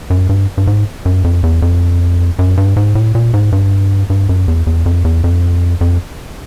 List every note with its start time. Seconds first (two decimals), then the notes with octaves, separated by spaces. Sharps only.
0.10 F#2
0.29 G2
0.58 G2
0.67 G#2
1.05 F#2
1.24 F2
1.43 E2
1.62 F2
2.39 F#2
2.57 G2
2.76 G#2
2.95 A2
3.15 A#2
3.34 G#2
3.52 G2
4.10 G2
4.29 F#2
4.48 E2
4.67 E2
4.86 F2
5.05 E2
5.24 F2
5.81 F2